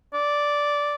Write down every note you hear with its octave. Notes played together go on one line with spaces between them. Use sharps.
D5